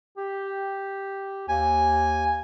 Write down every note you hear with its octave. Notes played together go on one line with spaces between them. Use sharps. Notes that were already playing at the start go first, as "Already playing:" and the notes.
G4
D#2 G#5